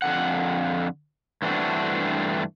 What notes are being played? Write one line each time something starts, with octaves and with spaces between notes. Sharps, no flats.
F2 D3 F#5
G2 E3 A3 C4 D4 F#4